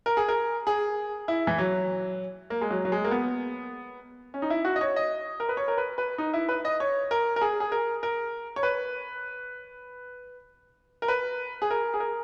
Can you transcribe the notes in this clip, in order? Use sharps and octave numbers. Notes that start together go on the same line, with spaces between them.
A#4
G#4
A#4
G#4
E4
E3
F#3
A#3
G#3
F#3
F#3
G#3
A#3
B3
C#4
D#4
E4
F#4
D#5
C#5
D#5
A#4
B4
C#5
A#4
B4
B4
D#4
E4
B4
D#5
C#5
A#4
A#4
G#4
G#4
A#4
A#4
C#5
B4
A#4
B4
G#4
A#4
G#4
A#4